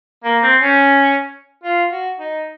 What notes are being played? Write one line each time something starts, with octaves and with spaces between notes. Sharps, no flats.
A#3
C4
C#4
F4
F#4
D#4